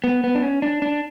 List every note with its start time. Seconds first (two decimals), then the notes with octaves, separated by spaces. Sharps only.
0.04 B3
0.24 B3
0.35 D4
0.42 C#4
0.62 D4
0.82 D4